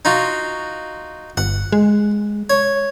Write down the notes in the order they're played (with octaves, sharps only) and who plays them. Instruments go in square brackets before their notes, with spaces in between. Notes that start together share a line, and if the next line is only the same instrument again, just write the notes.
[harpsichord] D#4 F4 F#4
[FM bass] G1 [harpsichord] F#5
[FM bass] G#3
[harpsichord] C#5